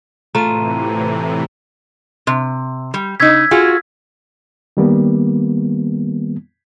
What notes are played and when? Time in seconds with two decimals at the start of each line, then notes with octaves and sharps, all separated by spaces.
0.35 A2 C3 E3 A3 F4 A#5 D#7
2.27 C3
2.94 G3
3.20 C#3 D#4 E6 G#6 B6
3.51 F4 F#4 G#4
4.77 D#3 G3 A#3 B3